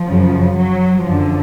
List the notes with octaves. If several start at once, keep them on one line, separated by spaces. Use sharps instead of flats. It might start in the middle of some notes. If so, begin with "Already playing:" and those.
Already playing: F3
F#2 C#3
F#3
F#2 D3 F3